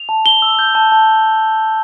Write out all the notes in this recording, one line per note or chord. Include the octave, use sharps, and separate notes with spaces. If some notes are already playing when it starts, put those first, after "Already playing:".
Already playing: F7
A5
A5 G7
E6
G6
A5
A5